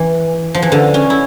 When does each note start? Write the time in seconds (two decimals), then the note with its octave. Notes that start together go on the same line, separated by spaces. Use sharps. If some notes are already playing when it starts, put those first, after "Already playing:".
Already playing: E3
0.55 F3
0.62 E3
0.72 D3
0.94 C#4
1.10 E4